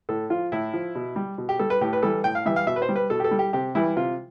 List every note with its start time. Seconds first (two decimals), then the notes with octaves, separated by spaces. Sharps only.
0.09 A2 A4
0.30 F3 F4
0.52 A2 E4
0.73 F3
0.95 B2
1.16 G3
1.38 B2
1.49 G4
1.59 G3 A4
1.70 B4
1.81 A2 G4
1.93 B4
2.03 E3 G3 A4
2.24 A2 G5
2.35 F5
2.46 E3 G3 E5
2.56 F5
2.67 B2 E5
2.76 B4
2.82 C5
2.89 G3
2.96 B4
3.10 B2 A4
3.20 G4
3.24 A4
3.31 G3
3.39 G4
3.53 C3 G4
3.75 E3 G3 E4
3.96 C3 F4